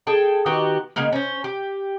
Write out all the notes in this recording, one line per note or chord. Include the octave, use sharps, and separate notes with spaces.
G#4 A4 G5 A5
D#3 B3 F#4 G4
C#3 G#3 A#3 B3
C#4 C5
G4